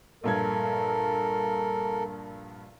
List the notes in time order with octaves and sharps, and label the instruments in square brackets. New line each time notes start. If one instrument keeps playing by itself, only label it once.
[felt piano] A#1 G2 G#6 [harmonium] A4 A#4